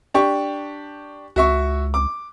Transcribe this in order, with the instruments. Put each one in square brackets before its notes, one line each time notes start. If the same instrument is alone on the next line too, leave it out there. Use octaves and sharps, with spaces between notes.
[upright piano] D4 G4 C#6
[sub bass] C#2 [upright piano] F#4 E5 C#6
[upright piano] D6